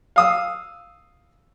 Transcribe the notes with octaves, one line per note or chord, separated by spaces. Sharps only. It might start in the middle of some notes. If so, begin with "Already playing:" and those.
F5 D#6 E6